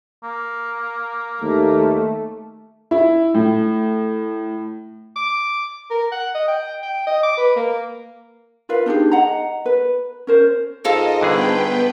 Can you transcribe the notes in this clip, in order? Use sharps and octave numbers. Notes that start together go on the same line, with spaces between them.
A#3
D#2 A3
E4
A2
D6
A#4
F#5
D#5
G5
G5
D#5
D6
B4
A#3
F4 A#4 B4 F5
D4 D#4 G4 G#4
D#5 F#5 A#5
B4
C#4 A#4 C5
G#2 F4 A4 A#4 D#5
G2 D3 B3 G#4 B4 G5